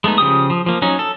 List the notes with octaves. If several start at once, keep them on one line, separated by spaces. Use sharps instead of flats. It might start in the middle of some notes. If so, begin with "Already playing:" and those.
G#3 A3 B3 D#4
C#3 F3 G4 D#6
F3
F3 A#3
F#3 C#4 D#4
A4